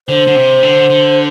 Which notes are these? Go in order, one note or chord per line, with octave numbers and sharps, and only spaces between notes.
D3 C5
D3
C3
D3
D3